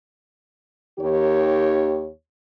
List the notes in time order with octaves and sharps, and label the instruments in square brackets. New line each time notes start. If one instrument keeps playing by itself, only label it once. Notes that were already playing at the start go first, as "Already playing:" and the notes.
[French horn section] D#2 D#3 G4 C#5